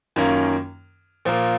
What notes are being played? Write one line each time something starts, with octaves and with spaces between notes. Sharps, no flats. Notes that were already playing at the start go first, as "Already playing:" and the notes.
F#2 D#3 A#3 C#4 F4
A#2 F3 A#3